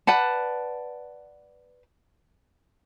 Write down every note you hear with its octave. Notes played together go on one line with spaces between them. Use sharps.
B4 D5 F#5 A5